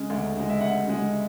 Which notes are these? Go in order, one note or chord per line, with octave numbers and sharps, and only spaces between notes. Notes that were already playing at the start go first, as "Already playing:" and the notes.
Already playing: C#3 G#3
D2
C#3 G#3
E5
D2 F#5
C#3 G#3